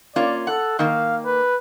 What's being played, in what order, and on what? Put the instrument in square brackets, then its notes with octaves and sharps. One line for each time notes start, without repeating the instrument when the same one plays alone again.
[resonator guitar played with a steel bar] A#3 C#4 F4 [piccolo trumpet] D5
[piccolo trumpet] A4 [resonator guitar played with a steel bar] F#5
[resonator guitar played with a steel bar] D#3 A#3 [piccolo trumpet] F5
[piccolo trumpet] B4